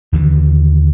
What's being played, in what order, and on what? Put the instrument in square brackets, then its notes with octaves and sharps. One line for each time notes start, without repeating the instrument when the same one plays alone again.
[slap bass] D#2 D3 E3